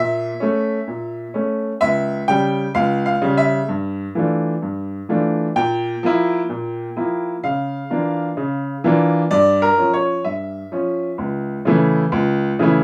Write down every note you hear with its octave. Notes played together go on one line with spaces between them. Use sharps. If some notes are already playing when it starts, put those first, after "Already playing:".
Already playing: A#2 E5
A3 C#4
A#2
A3 C#4
C#2 E5
C#3 G3 G5
C#2 F5
F5
C#3 G3
E5
G2
E3 A3 D4 F4
G2
E3 A3 D4 F4
A#2 G5
F3 A#3 E4
A#2
F3 A#3 E4
C#3 F5
E3 A#3 D4 F4
C#3
E3 A#3 D4 F4
G2 D5
A#4
F3 C#4
C#5
G2 E5
F3 C#4
C#2
C#3 E3 A3 E4
C#2
C#3 E3 A3 E4